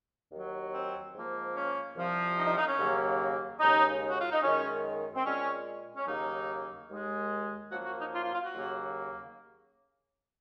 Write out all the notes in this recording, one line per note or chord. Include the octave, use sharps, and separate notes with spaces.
D#2 D#3 F#3
C4
G#2 F3 A#3
C#4
C2 C3 F3
D#4
D#4
D#4
C#4
D#2 C#3 F#3 A#3
D#2 C#3 G#3 D#4
F#4
F4
D#4
F#2 D#3 G#3 C#4
C4
A#2 G#3 C#4
C#4
D#2 C#3 F#3 A#3 D#4
D#2 D#3 G#3
F#2 F3 A#3 F#4
F#4
D#4
F4
F4
F4
F#4
D#2 C#3 F#3 A#3